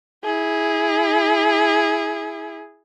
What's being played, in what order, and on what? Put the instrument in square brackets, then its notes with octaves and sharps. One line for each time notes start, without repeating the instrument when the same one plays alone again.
[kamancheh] E4 G#4